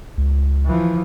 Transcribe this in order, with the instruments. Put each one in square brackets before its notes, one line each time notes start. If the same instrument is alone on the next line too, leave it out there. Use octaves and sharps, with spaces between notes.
[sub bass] C#2
[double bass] E3 F3